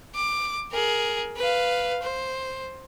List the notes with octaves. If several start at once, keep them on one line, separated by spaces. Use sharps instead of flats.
D6
G#4 A#4
B4 F5
C5